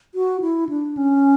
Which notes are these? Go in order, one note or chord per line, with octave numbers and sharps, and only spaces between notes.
F#4
E4
D4
C#4